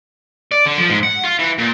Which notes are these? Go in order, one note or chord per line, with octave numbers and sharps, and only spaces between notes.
D5
D3
F3
G#2
F#5
F4
E3
A#2